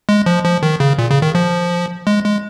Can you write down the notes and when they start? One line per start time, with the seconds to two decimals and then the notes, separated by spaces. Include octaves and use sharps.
0.09 G#3
0.26 F3
0.45 F3
0.63 D#3
0.80 C#3
0.98 A#2
1.11 C#3
1.22 D#3
1.35 F3
2.07 G#3
2.24 G#3